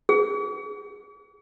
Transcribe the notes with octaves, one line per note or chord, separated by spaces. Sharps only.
G#4